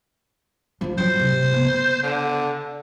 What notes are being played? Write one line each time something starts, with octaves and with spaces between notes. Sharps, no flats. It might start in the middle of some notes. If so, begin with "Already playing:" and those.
G#2 F3
F#3 C#4 C5
C3
C#3 B3
D3